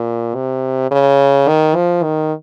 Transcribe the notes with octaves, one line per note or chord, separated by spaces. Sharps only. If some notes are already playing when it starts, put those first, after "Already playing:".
Already playing: A#2
C3
C#3
D#3
F3
D#3